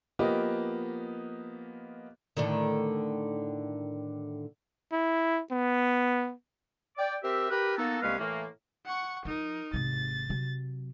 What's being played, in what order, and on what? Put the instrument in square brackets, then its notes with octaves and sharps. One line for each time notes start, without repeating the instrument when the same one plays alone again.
[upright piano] F3 A#3 B3 G4 D#5
[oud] A2 D3 D#3
[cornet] E4
B3
[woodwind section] D5 G5 D6
C4 G4 A#4 E5
G4 A#4 B4
A#3 B3 D#4 F#4 A4
C2 G#3 A#3 C#4 B4 F5
A2 E3 A3 A#3
[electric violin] F#5 C#6
[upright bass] F3 [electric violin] D#4 A#4
[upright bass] G#1 C3 [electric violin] A6
[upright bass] C3 F#3